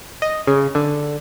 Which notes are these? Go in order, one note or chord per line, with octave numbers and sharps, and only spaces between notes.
D#5
C#3
D3